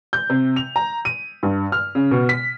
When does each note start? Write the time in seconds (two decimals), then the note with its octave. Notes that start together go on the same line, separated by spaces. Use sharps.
0.13 G6
0.30 C3
0.56 F7
0.76 A#5
1.05 D#7
1.43 G2
1.72 F6
1.95 C#3
2.11 B2
2.29 B6